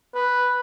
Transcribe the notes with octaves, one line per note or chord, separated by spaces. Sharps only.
B4